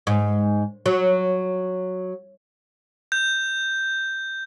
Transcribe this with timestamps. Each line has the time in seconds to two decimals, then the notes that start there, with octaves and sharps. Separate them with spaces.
0.07 G#2
0.86 F#3
3.12 G6